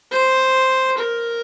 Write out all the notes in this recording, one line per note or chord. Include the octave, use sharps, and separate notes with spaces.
C5
A#4